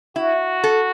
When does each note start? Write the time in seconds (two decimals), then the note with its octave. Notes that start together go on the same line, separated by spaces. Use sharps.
0.16 E4 F#4
0.64 A4